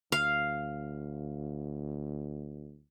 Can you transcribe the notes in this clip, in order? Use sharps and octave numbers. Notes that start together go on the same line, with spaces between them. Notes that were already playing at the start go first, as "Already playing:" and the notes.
D2 F5